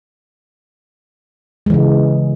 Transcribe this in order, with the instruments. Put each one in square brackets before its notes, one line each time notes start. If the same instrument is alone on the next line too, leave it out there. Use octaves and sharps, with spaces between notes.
[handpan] G#3
E3
C#3